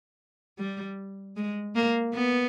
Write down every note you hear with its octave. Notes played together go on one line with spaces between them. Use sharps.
G3
G#3
A#3
B3